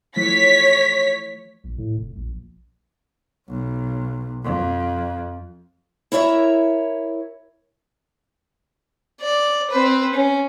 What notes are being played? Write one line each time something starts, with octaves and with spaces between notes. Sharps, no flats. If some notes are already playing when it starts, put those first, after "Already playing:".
E3 F3 A3 C#5 B6
A#1
A2
F1
A#1
B1
F2
E4 A#4 C#5 E5
D5
C4 B4
C#4